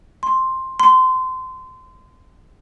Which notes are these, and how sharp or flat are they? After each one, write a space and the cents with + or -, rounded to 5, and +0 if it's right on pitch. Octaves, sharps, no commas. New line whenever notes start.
C6 +5
C6 -25